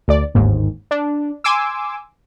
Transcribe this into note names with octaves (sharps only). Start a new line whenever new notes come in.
D2 D5
G1 D#2 G#2
D4
G#5 C6 D6 E6